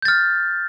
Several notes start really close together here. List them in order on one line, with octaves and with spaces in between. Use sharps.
G6 A6 F6